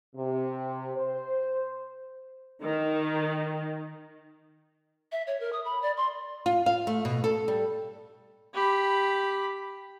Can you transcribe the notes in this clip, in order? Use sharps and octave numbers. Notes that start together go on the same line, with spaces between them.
C3
C5
D#3
E5
C#5
A#4
D#6
B5
D5
C6
F4
F5
A3
B2
A4
G3
G4 B5